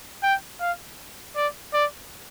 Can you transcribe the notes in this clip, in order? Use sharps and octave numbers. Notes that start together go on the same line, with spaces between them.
G5
F5
D5
D5